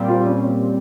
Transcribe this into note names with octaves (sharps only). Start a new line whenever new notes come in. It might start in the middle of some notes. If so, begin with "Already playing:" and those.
Already playing: A#2 G3 C4
F4
C#4